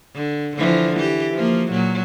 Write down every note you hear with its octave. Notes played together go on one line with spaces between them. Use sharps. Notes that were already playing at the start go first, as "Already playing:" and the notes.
D3
D3 E3 F3
E3 G4
F3 A#3
A#2 F#3